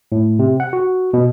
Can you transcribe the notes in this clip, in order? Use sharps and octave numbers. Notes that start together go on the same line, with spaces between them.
A2
C3
F#5
F#4
B2